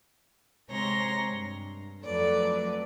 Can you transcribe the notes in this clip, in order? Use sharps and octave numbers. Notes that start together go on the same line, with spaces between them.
C3 G#3 C#5 A#5 C6 A#6
G2
F2 F#3 A3 A4 B4 D5